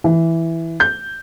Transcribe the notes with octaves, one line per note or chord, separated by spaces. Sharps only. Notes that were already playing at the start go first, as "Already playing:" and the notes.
E3
G6